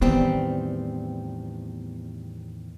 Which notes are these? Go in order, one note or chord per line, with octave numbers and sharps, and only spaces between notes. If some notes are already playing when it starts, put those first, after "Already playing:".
E2 A2 D#3 G3 B3 C4